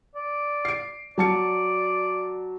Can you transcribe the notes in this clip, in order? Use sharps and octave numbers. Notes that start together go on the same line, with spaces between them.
D5
C7 D7
F#3 D5 A5 C#7